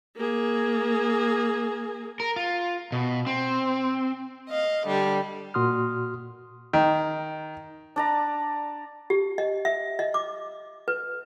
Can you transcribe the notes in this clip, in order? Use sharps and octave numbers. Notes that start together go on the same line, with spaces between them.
A#3 G#4
A#4
F4
B2
C4
D#5 F5
D3 G3
A#2 F#4 C6 D#6 F6
D#3
D4 D5 A#5
G4
D#5
E5
D#5
D6
B4